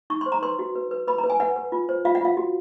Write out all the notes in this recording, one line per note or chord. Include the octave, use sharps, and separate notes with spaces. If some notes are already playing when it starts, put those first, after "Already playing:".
D#4 C#6
C6
C5
A#5
B4 C6
F#4
B4
B4
B4 B5
A#5
B4
G#5
B4 F#5
B4
F4
C5
F4 F5
F#5
F4 F5
F#4